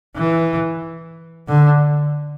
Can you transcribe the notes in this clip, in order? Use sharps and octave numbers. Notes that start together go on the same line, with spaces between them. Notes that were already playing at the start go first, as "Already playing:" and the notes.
E3
D3